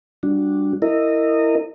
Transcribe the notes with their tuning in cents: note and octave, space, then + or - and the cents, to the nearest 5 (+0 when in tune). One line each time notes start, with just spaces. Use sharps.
G3 +0 D4 +0 F#4 -15
E4 +0 A#4 -25 D#5 -10